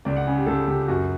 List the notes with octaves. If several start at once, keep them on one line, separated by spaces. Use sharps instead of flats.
C#2 D5
F#5
C#3
G4
C#2 A4
C#2 G4
F#2 F#4